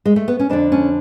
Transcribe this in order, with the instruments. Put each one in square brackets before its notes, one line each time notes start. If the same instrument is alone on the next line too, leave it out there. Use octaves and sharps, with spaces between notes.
[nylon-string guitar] G#3
A3
B3
C#4
F2 D3 D4
C#4